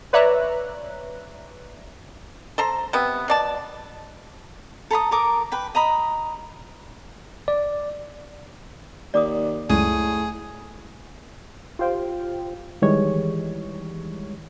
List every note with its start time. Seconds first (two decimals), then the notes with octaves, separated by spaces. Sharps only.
0.13 B4 C#5 D5 E5 A#5 F#6
2.58 A4 C5 A#5
2.93 C3 B3
3.28 B2 D5 A5
4.91 A4 A#5 B5 D#6
5.11 A4 A#4 D6 D#6
5.52 B4 G5 B5
5.75 D#5 A#5 B5 D#6
7.48 D5
9.14 D#2 D5 D6 D#6
9.70 C#2 F#2 A2 G#4 D#7
11.79 F4 G4 C5 F5 G5
12.82 D#3 E3 G3 G#3 C#5